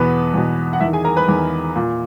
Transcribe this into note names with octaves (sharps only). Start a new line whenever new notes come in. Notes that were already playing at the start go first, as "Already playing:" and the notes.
Already playing: E2 B2 B3 B4
E2 B2
F#5
E2 D#3 E4 E5
G#4 G#5
A#4 A#5
B4 B5
E2 D#3
A#2